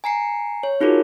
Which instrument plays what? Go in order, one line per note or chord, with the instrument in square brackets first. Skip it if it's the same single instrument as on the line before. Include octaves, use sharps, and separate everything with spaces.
[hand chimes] G#5 A#5 C7 C#7
C#5
D#4 F4 F#4 G#4 A#4